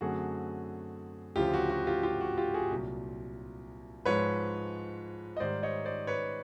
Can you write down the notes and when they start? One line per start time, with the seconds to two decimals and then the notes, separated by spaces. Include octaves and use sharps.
0.01 F#2 D3 F#3 A3 C4 F#4 G#4
1.36 D2 C#3 F3 F4 G4
1.54 F#4
1.70 F#4
1.87 F4 G4
2.03 F4 G4
2.21 F#4
2.37 F4 G4
2.54 F#4 G#4
2.71 C2 A#2 F#3
4.05 G#2 F3 G#3 B4 C#5
5.37 D#5
5.40 G#2 D#3 G3 C5 D5
5.63 C#5 D#5
5.85 C5 D5
6.07 B4 C#5